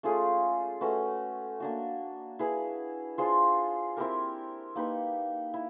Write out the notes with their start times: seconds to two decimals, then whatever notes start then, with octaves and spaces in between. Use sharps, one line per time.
0.03 A3 C#4 F4 G#4
0.81 A3 C#4 F#4 B4
1.60 A#3 D4 F#4
2.39 E4 G#4 B4
3.18 D4 F4 G#4 C5
3.97 C4 E4 G4 A#4
4.75 A#3 D#4 G4 B4
5.54 E4